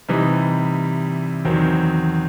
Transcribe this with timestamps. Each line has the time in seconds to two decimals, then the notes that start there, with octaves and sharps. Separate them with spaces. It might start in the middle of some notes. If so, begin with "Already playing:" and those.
0.09 C3 E3 G3 D#4
1.45 E2 D#3 F#3 C4